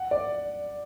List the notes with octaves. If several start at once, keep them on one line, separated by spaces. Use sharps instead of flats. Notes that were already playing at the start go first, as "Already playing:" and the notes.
Already playing: F#5
D5